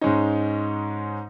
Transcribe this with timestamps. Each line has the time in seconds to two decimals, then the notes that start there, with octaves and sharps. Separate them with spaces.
0.01 G#2 G#3 C#4 D#4